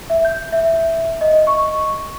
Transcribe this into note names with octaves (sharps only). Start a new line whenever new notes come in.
E5
G6
E5
D#5
C#6